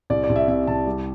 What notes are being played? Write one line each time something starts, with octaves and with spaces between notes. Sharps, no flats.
C2 D5
D5
C2
E5
C3 E5
C2 A5
G3